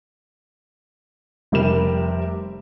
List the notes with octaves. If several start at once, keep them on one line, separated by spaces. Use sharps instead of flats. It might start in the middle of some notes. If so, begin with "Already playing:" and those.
F1 C3 G3 G4 A#4 E7